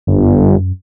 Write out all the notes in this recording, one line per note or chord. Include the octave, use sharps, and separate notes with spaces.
G1 F#2